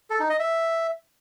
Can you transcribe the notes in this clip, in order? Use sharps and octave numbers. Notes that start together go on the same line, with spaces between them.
A4
D#4
D#5
E5